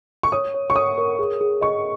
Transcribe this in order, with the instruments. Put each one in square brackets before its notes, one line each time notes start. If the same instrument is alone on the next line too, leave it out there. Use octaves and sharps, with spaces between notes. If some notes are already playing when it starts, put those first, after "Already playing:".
[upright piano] C#6
[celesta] C#5 [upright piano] D#6
[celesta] C#5
[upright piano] C#6
[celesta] C#5 [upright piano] D#6
[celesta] A#4
G#4
G#4
[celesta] D#5 [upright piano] C#6